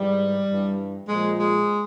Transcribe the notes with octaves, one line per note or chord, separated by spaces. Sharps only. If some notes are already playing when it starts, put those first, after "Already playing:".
Already playing: G#2 E3 G3
G2 E3
A#2 F3 G#3
G#3